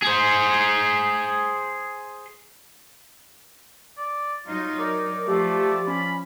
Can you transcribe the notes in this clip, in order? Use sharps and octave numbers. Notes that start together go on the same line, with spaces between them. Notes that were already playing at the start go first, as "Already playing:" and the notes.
G#4 C5
D5
F#3 D#4 F4
A#4 D5
F3 A3 G4
C#4 B5